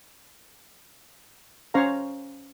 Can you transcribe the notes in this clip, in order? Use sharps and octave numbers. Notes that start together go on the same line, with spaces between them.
C#4 C5 C#5 F5 A#5